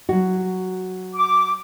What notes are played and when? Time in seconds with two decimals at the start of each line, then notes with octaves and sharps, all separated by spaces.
0.09 F#3 F#4
1.14 D6